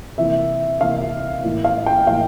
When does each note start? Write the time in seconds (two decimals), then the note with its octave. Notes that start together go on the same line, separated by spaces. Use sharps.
0.18 C3 E3 A#3 E5
0.81 C3 E3 A#3 F5
1.44 A2 E3 A#3
1.64 F5
1.86 G5
2.07 A2 E3 A#3 F5